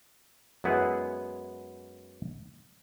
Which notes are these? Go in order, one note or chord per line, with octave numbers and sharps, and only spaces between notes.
F#2 G#3 B3 E4 G#4 F#5